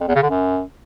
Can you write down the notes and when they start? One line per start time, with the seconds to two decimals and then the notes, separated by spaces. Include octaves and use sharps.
0.01 F2
0.08 E2
0.15 C#3
0.23 D3
0.30 F#2